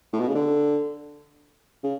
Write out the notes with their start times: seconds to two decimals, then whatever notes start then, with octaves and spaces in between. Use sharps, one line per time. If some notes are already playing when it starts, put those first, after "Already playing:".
0.13 A2
0.20 B2
0.28 C#3
0.35 D3
1.84 C#3